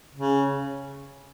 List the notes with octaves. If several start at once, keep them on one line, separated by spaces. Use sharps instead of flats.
C#3